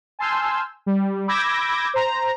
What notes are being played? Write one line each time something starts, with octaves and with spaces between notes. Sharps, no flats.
G#5 A5 C6 E6 F6 G6
G3
B5 D6 E6 G6 G#6 A#6
C5 A#5